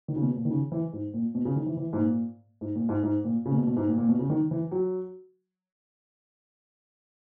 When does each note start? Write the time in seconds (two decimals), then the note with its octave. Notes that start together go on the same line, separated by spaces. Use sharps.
0.08 D#3
0.16 C#3
0.22 B2
0.36 A#2
0.45 D#3
0.50 C#3
0.72 E3
0.93 G#2
1.14 A#2
1.35 B2
1.45 C#3
1.56 D#3
1.66 E3
1.77 E3
1.93 G#2
1.97 A#2
2.61 G#2
2.75 A#2
2.89 G#2
3.03 G#2
3.24 A#2
3.46 C#3
3.51 A#2
3.56 B2
3.67 B2
3.77 G#2
3.87 A#2
3.98 A#2
4.09 B2
4.19 C#3
4.30 D#3
4.51 E3
4.71 F#3